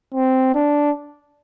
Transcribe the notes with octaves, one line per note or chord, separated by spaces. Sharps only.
C4
D4